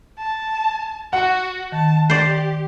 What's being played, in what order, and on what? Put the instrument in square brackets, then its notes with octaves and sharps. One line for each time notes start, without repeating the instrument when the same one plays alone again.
[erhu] A5
[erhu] F#4 [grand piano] F#5
[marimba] D#3 [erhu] A5
[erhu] G4 [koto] C5 D5